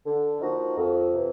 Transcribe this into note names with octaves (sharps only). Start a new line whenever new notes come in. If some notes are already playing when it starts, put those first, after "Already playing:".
D3
F3 A#3 D#4 F#4
F2
C3 E3